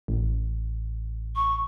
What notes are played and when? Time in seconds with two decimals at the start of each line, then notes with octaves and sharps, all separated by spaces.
0.08 A1
1.36 C#6